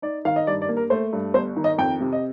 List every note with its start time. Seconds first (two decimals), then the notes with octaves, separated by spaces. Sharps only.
0.02 D#4 D5
0.25 D#3 F5
0.36 D#5
0.47 G2 D5
0.62 D5
0.69 A#3
0.77 A#4
0.90 A3 C5
1.13 G2
1.34 G1 C5
1.56 D#3
1.64 D#5
1.78 F2 G5
2.01 C3
2.12 D#5